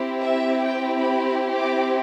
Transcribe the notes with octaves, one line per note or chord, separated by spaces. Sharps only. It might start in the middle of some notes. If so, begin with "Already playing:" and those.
Already playing: C4 E4 G4
E5
G5
B5
D6